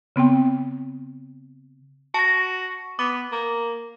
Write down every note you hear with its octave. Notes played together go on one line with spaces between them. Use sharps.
C#3 B3 C4 G5
F#4 A5 A#6
B3 D6
A#3